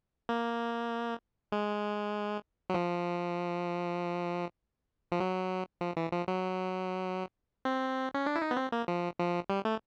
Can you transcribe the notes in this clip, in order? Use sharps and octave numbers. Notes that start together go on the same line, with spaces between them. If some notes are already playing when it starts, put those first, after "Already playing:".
A#3
G#3
F#3
F3
F3
F#3
F3
E3
F3
F#3
C4
C#4
D4
E4
D#4
B3
C4
A#3
F3
F3
G3
A3